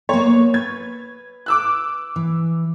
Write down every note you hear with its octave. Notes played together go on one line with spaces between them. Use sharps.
A#3 B3 C#5
B4 G#6
D6 E6 F#6
E3